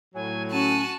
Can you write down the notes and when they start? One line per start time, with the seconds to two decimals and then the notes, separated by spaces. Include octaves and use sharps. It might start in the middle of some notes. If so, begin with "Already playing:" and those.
0.15 A2 F#3 G#5
0.52 C#4 F#4 A5 D#7